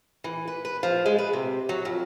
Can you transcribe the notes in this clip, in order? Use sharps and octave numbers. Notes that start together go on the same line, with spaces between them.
E3
B4
B4
F3
G#3
B4
C3
F#3
F2